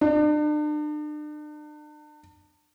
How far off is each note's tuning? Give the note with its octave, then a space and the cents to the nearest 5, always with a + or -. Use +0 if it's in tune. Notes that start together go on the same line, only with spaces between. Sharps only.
D4 +40